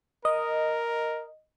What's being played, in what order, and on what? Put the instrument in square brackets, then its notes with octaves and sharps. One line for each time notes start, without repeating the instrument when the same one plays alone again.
[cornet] A#4 [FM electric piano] D#5